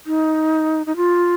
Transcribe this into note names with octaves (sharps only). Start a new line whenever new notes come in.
D#4
D#4
F4